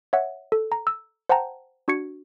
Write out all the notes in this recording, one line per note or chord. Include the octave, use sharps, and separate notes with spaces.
C#5 E5 F#5
A4
A#5
E6
C5 F#5 G5 A5 A#5
D4 F#4 C#6 G#6 C#7